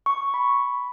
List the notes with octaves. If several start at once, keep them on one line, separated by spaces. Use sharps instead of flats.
C#6
B5